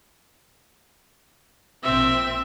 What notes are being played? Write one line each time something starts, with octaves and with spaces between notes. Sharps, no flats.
A#1 C4 E5